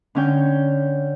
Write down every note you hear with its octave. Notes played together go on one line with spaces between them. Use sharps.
D3 C#4 G5 G6